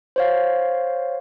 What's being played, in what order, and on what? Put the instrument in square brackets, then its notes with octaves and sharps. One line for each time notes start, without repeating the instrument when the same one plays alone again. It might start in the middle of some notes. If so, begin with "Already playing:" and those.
[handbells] C5 C#5 F5